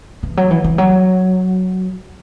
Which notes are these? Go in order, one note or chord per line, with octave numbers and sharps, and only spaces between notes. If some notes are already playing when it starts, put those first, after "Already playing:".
E3
F#3
E3
E3
F#3